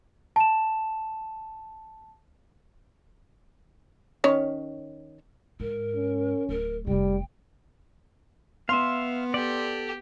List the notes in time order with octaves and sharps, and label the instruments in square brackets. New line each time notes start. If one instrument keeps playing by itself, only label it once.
[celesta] A5 E7
[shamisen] D#3 C#4 C#5
[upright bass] G#2 [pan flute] A#4
[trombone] C#4
[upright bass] D1 [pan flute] A#4
[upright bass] F1 C3 [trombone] G3 [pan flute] G5
[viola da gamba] B3 [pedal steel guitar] E5 F5 [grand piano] C6
[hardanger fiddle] G4 [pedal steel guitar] A4 D5